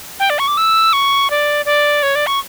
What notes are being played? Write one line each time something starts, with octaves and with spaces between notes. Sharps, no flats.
G5
D5
C#6
D6
E6
C#6
D5
D5
C#5
D5
C#6